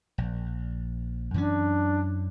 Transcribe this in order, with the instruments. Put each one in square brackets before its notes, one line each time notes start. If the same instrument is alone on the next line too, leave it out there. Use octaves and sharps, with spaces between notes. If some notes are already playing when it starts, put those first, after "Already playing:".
[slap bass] A#1
[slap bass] F#2 E3 C#4 [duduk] D4